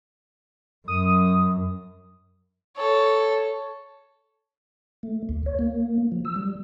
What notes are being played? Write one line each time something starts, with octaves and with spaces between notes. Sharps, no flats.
F#2 D#6
A4 C#5
A3
D2
C#5
A#3
F3
E6
G3